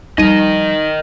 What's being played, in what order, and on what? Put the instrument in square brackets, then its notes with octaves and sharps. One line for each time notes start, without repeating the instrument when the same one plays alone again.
[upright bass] F3 G3 [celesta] D#4 D#7 [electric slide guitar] A#4 D#5